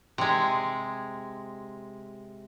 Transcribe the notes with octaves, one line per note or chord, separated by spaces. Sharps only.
C3 G#3